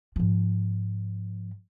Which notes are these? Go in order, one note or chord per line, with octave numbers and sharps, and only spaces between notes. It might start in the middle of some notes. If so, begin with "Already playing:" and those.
G#2 F3